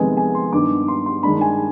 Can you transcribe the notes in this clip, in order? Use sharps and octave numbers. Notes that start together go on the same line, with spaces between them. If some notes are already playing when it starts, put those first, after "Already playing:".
Already playing: F2 C3 D#3 G#3 B3 G#5
G#5
C6
G2 D#3 B3 D4 D6
C6
C6
G2 D#3 G#3 D4 B5
G#5